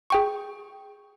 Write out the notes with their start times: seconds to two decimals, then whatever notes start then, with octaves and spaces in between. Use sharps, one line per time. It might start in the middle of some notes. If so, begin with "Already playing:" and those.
0.10 G#4 G5 C#6